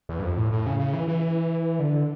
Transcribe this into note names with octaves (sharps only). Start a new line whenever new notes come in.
E2
G2
F2
A2
A2
C#3
C#3
E3
E3
D3